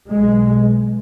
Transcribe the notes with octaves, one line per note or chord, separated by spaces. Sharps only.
B1 B2 G#3